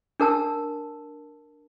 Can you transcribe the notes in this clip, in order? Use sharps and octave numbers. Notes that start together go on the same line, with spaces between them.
D4 A#4 A5 E6